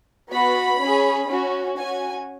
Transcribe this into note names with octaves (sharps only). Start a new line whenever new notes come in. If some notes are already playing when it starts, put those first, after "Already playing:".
B3 F#4 B5
C#4 G#4
C#4 F#4
C#4 F#4 G#5